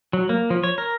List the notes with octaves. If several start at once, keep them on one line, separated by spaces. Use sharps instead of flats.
F#3
A#3
F3
C#5
A#4